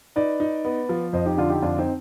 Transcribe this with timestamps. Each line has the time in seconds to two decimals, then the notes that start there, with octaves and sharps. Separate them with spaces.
0.16 D#4 B4 D5
0.40 D#4
0.65 B3
0.89 F3
1.13 F2 C5 D#5
1.26 D#4 G4
1.38 D3 D4 F4
1.50 D#4 G4
1.62 F2 D4 F4
1.78 C4 D#4